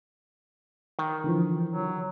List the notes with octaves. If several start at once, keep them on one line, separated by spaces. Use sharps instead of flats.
D#3
D3 E3 F3
F#3